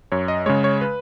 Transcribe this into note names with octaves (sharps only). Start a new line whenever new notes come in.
F#2 C#5
D#5
C#3 G#3 C#5
C#5
B4